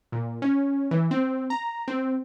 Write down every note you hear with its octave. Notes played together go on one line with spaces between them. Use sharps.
A#2
C#4
E3
C4
A#5
C4